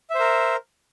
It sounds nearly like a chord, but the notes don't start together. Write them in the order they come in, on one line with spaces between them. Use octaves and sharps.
E5 C5 A#4